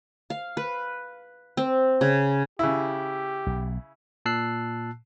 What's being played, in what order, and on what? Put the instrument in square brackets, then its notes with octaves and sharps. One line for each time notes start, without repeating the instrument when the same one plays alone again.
[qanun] F5
B4
C4
C#3
[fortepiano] C#3 E4 [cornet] G4
[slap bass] B1
[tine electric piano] A#2 A5 E6 F#6 C7